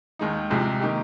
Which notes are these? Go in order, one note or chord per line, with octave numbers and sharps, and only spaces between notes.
D#2 D#3 G#3 D#4
C2 C3 F3 G#3 C4
D#3 A#3 D#4 G4